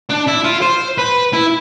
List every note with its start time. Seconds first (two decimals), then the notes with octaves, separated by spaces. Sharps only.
0.09 D4
0.27 E4
0.44 F4
0.62 C5
0.98 B4
1.33 E4